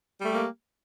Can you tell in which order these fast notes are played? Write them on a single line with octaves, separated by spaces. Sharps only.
G3 A3 G4 A#3